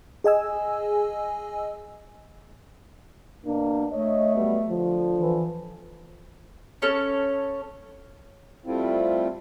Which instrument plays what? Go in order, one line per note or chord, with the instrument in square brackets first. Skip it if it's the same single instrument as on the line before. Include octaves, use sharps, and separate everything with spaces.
[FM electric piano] G#4 D#5 G#5 E6
[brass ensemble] B2 A#3 D4
[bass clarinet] A3 [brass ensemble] C#5 D#5
[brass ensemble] F#3 G3 B3
D3 F3
[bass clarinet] E3
[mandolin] C#4 A4 C#5 A5
[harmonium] G3 A3 C4 E4 F4